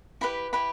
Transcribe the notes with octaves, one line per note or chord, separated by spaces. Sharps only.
E4 G4 B4 B5
E4 G4 B4 B5